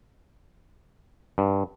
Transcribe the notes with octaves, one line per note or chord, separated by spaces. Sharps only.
G2